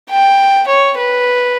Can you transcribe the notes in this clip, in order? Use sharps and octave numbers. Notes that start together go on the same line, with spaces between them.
G5
C#5
B4